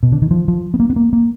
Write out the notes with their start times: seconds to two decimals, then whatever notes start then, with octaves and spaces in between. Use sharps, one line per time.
0.03 B2
0.12 D3
0.22 D#3
0.31 F3
0.48 F3
0.74 B3
0.80 A#3
0.90 B3
0.96 A#3
1.13 A#3